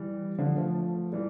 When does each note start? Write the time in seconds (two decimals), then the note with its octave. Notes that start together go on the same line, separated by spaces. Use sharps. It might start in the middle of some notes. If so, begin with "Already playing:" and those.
Already playing: E3 G3
0.38 D3 F3
0.56 F3 A3
1.13 E3 G3